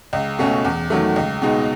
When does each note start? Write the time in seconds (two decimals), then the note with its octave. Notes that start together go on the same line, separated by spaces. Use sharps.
0.13 C#2
0.39 B2 A3 C#4
0.65 E2
0.90 D#3 F#3 A3
1.16 C#2
1.42 B2 G#3 D#4